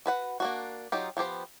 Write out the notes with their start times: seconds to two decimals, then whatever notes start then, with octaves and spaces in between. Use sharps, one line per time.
0.06 F#4 B4 F#5
0.40 A#3 D4 F#4
0.92 F#3 D#4 F4 G4
1.17 F3 B3 G4 C5